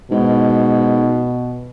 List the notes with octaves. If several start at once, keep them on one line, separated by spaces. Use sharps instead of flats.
G#2 B2